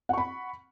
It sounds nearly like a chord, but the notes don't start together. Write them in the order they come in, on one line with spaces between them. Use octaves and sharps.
F#5 C#6 B5